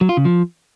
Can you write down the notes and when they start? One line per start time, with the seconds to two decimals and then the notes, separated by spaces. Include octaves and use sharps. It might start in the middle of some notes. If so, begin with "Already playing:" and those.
0.01 F#3
0.09 F4
0.17 C#3
0.25 F3